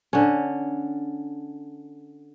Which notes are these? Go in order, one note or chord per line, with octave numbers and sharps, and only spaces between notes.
D3 C#4